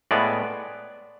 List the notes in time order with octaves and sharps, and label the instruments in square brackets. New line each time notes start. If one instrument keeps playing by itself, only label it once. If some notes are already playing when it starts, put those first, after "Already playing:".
[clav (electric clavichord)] A2 G#3 B3 D5